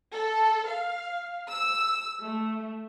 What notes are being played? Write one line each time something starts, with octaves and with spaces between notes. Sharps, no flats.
A4
F5
E6
A3